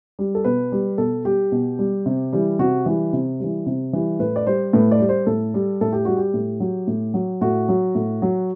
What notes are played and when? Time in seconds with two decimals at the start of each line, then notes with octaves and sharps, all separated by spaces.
0.19 G3
0.35 A4
0.44 B2 B4
0.72 G3
0.98 B2 A4
1.25 G3 G4
1.52 B2
1.79 G3
2.06 C3
2.33 E3 G3
2.59 C3 F#4
2.86 E3 G3
3.13 C3
3.40 E3 G3
3.66 C3
3.93 E3 G3
4.19 A2 B4
4.36 D5
4.46 G3 C5
4.73 A2 B4
4.91 D5
5.00 G3
5.09 C5
5.26 A2 A4
5.54 G3
5.81 A2 A4
5.92 G4
6.05 G3 F#4
6.17 G4
6.34 A2
6.60 F#3
6.87 A2
7.14 F#3
7.41 A2 F#4
7.69 F#3
7.95 A2
8.22 F#3